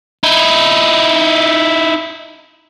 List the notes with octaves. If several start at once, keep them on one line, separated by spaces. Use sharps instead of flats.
D#4 E4